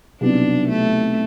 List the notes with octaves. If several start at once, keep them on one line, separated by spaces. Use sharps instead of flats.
C2 B2 F#3 B3 D4 D#4
A3